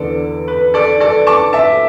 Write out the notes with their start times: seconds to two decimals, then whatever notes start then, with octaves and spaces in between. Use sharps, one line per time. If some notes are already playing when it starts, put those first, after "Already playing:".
Already playing: E2 D3 B3 A4 D5
0.48 B4
0.74 A4 D5
1.00 A4 D5
1.27 A5 D6
1.53 E5 A5